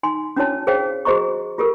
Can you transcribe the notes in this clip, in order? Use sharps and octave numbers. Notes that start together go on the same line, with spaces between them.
D#4 G#5 C6
C#4 D4 E4 F#4 C#5 A5
G#4 C5 C#5 F5 G5
F#4 G#4 C5 D#5 A#5 C#6
F4 G4 A4 A#4